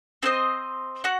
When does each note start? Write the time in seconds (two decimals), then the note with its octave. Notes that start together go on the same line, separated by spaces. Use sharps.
0.23 C4 E4 C5 D#5
1.04 F#4 F#5